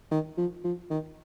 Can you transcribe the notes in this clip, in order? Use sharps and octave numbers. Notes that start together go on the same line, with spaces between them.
D#3
F3
F3
D#3